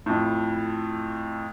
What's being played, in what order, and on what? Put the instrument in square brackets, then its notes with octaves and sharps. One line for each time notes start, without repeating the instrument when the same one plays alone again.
[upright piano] F2 A2